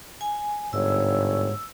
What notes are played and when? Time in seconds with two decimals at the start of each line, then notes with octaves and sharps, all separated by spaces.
0.21 G#5
0.73 G1 G#2 C#5 E6